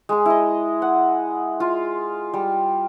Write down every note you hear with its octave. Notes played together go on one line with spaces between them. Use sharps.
G#3 G#4
E4 D#5
F#5
F4
G3